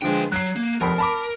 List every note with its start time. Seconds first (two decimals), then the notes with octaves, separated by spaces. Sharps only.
0.02 D3 F3 G#3 B4 G5
0.32 F#3 F#6 C7
0.56 A#3
0.81 F1 F2 A#4 B5
0.98 A5 B5 D6